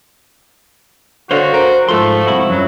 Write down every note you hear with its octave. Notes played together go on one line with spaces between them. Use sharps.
D3 F#4 C5 C#5 F5
A#4 C5
G#2 F3 A3 A4 C6
C2 E4 F#4
F#2 F#3